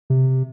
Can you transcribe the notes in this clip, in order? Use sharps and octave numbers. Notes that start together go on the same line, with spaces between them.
C3